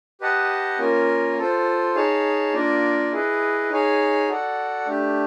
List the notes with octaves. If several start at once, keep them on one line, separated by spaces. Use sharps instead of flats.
G4 B4 D#5 F#5 A5
A#3 C#4 F4 A#4
F4 A4 C5
D#4 G#4 C#5 F5 A5
A#3 D4 F4 A#4 D5
E4 G#4 B4 D#5
D#4 G#4 C#5 F5 G#5
F#4 A4 D5 F#5
A3 D4 G4